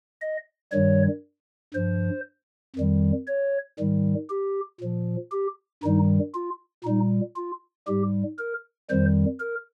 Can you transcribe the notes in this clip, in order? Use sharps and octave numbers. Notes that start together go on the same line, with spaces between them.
D#5
G2 D#3 G3 C#5
G2 F3 C5
F2 D#3 G3
C#5
G#2 D#3 G3
G4
A#2 F3
G4
G2 D#3 G3 D#4
F4
A#2 G3 D#4
F4
G#2 G3 G4
A#4
F2 D#3 G3 C5
A#4